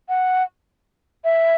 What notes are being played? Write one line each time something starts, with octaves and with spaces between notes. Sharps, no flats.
F#5
E5